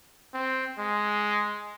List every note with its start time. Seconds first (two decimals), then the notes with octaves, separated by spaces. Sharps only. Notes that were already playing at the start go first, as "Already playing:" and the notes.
0.34 C4
0.78 G#3